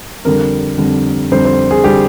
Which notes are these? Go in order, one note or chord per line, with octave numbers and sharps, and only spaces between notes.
F2 D3 G3 A#4
F2 D3 G3
F2 D3 G3 C5
C5
G#4
D3 G3 G4